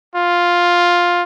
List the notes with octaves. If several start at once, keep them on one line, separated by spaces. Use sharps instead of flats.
F4